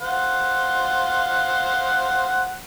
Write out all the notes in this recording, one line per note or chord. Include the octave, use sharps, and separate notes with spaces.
C5 F5 F#5